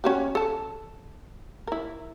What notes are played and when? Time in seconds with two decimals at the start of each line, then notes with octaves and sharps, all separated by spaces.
0.04 C#4 F#4 G4
0.35 A4 A5
1.67 E4 A#4